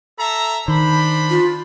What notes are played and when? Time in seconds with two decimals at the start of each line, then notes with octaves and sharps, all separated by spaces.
0.19 A4 E5 A#5
0.68 D#3 D4 C5 B5
1.30 F4